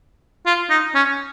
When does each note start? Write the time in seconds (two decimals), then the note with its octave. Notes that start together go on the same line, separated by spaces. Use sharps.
0.46 F4
0.70 D#4
0.95 C#4